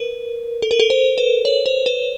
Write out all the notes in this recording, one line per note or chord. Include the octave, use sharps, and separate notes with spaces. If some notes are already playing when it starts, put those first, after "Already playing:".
Already playing: A#4 B4
A4
A#4
A4
C5
B4
C#5
C5
B4